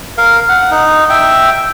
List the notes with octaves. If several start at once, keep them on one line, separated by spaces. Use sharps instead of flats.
A#4 F5
F#5
D#4
E5 G5